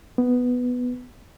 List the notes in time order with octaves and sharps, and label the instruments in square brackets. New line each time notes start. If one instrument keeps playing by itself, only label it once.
[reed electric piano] B3